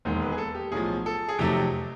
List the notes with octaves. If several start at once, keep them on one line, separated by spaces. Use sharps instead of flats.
E1 D#2 D#3 G#3 C5
B4
G#4
A4
G4
B1 A2 F3 G#4
A4
G#4
F2 C3 D#3 F#3 A3 G4